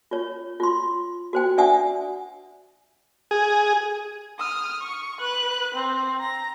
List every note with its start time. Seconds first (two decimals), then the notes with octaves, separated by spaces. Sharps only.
0.11 F4 C#5
0.60 F4 C6
1.33 F#4 C5 G5
1.58 D4 D5 E5 F#5 G#5 D#6
3.31 G#4
4.39 D#6 F6
4.81 C#6
5.20 B4 F#6
5.74 C4
6.20 A#5